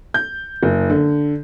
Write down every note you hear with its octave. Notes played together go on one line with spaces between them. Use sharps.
G6
F#1
D3